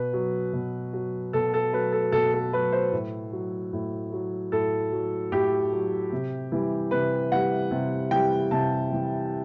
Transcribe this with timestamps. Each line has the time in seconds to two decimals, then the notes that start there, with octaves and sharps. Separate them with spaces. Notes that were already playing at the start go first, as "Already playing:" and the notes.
Already playing: B2 B4
0.13 F#3
0.53 B2
0.93 F#3
1.33 B2 A4
1.54 A4
1.73 F#3 B4
1.92 A4
2.12 B2 A4
2.33 A4
2.52 F#3 B4
2.72 C5
2.92 A2
3.32 F#3
3.73 A2
4.12 F#3
4.52 A2 A4
4.92 F#3
5.32 A2 G4
5.72 F#3
6.12 C3
6.52 E3 G3
6.91 C3 B4
7.32 E3 G3 F#5
7.71 C3
8.11 E3 G3 G5
8.51 C3 A5
8.90 E3 G3